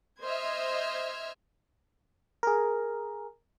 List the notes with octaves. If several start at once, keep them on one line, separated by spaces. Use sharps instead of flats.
C5 D#5 E5 F6 G#6
G#4 A#4